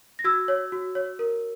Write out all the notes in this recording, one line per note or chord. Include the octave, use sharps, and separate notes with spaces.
A#6
F#4 E6 G#6
C#5
F#4
C#5
A#4